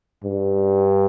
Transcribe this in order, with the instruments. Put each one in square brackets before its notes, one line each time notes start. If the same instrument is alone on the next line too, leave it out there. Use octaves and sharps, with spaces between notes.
[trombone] G2